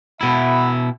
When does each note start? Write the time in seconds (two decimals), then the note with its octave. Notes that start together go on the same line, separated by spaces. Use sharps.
0.21 B2 E4 E5 F#5 B5